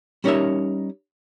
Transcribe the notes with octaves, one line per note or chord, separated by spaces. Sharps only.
G3 C#4 D#4 A#4 C#5 E5